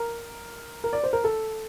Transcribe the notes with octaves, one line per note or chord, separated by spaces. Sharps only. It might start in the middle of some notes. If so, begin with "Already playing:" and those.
Already playing: A#4
A#4
D5
C5
A#4
A4